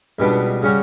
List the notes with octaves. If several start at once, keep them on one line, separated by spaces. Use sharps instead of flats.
C#2 B2 G3 B3 D4
C#3 G3 C#4 F#4